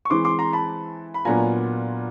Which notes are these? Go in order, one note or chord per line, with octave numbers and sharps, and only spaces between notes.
C#6
E3 G#3 C4 E4 C6 D6
C6 D6
A#5 C6
A5 B5
B5
A#2 F#3 B3 D4 F4 G#5 A#5